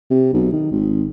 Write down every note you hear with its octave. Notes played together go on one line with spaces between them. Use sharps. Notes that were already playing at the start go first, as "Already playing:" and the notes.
C3
B1
D#3
G#1